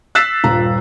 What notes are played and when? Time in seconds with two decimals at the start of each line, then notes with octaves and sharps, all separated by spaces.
0.15 E6 F#6 A6 B6 C7 E7
0.44 D#1 G2 F4 A#5